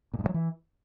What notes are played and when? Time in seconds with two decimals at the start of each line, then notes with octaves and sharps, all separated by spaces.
0.14 A#2
0.19 G2
0.24 A2
0.29 F#3
0.34 E3